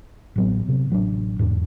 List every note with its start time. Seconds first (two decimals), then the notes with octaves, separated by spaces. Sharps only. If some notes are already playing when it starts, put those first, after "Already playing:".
0.36 A1 F#3 B3
0.68 C3
0.90 A1 F#3 C4 D4
1.39 E2 G#2 G3 D4